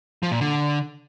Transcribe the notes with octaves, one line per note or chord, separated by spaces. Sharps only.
F3
A#2
D3